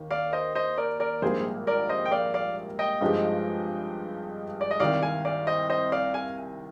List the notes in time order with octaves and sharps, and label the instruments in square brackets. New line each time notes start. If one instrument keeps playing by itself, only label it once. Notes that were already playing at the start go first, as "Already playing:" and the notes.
Already playing: [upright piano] D#2 D#3 A#3
[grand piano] D5 F5
C5 D#5
C5 D#5
A#4 D5
A#4 D5
[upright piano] A#1 G#2 G3 A#3 [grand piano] G#4 C5
[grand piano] A#4 D5
C5 D#5
G5
D5 F5
D5 F5
D#5 G5
[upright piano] G2 F3 G#3 D#4 G4
[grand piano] D5
D#5
[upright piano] C2 C3 D#3 [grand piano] D5 F5
[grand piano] F5 G#5
D5 F5
C5 D#5
C5 D#5
D5 F5
F5 G#5